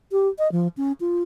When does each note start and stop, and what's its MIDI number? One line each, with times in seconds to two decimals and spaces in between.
0.12 0.28 67
0.39 0.51 75
0.52 0.68 53
0.77 0.92 61
1.00 1.22 65